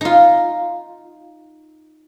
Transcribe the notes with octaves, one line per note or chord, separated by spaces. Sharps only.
D#4 F4